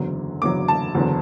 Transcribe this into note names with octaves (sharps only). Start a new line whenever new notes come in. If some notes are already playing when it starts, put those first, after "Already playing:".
Already playing: F#1 E2 D3 F#3
F#1 E2 D3 F#3 D6
A5
F#1 E2 D3 F#3